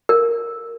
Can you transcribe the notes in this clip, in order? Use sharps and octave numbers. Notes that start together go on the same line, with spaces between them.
A#4